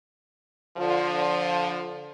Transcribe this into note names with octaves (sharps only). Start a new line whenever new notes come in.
D3 F3